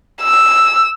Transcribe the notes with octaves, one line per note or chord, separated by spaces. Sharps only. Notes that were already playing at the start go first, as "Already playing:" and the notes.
E6